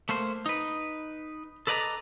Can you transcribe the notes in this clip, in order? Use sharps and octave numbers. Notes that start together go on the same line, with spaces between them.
A3 A#3 C5
D#4 B4
A4 B4 D5 D#5 G5 A#5